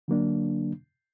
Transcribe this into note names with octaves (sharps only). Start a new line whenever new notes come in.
D3 F#3 A#3 D4